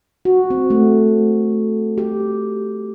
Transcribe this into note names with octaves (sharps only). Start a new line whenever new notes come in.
F#4
C4
A3
G4